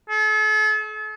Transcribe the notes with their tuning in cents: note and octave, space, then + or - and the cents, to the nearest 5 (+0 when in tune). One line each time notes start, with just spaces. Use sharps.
A4 -40